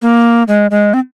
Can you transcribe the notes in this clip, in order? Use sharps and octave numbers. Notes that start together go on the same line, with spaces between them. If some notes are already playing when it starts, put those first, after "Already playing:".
A#3
G#3
G#3
C4